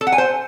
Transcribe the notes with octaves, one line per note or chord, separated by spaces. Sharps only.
A4
F#5
G#5
C5